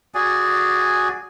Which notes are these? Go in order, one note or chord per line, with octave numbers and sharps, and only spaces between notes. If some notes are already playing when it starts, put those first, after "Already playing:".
F#4 G#4 D5 G#5